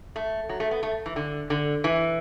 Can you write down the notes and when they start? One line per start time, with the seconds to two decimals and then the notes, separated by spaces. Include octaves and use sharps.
0.16 A3
0.49 F#3
0.60 A3
0.71 B3
0.83 A3
1.06 E3
1.16 D3
1.50 D3
1.84 E3